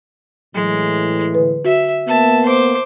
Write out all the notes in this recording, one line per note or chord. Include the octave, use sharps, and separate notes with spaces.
A2 E3 F#3 G#3
D3 B4
F#4 E5
A#3 B3 E5 A5
C5 D6